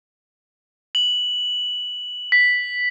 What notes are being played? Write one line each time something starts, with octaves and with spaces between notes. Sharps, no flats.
F#7
B6